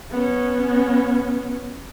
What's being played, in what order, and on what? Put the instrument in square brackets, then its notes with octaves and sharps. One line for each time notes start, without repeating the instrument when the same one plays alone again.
[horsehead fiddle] B3 C#4